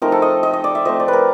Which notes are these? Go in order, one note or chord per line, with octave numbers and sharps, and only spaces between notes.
F3 A3 C4 D#4 A#4
A4
D#5
D#5
D#5
D5
E5
F3 A3 C4 D#5
D5
B4
A#4